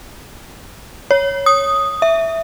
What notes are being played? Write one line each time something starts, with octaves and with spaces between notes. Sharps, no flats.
C#5
D#6
E5